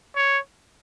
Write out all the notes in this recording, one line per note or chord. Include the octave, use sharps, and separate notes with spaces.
C#5